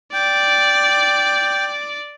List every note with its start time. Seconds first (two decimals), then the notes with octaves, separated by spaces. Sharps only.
0.13 D5 G5